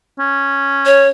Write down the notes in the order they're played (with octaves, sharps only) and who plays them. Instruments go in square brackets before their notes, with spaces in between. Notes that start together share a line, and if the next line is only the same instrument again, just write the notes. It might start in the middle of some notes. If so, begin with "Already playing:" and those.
[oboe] C#4
[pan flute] C#5